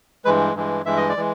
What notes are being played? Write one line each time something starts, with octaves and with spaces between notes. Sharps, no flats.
G2 E3 G#3 B4
G2 E3 G#3
G2 E3 G#3 E5
D#5
D5
E3 G#3